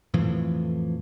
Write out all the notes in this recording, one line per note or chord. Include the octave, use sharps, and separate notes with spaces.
F2 A2 E3 F3